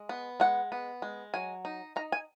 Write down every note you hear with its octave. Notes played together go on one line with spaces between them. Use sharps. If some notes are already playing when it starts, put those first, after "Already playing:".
Already playing: G#3
B3
G#3 F#5
B3
G#3
F#3 G#5
D#4
D#4 A#5
G#5